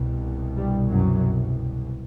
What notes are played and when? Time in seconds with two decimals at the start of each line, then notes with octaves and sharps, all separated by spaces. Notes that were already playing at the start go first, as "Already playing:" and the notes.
Already playing: C2 B2
0.56 G2 G3
0.89 F#2 F#3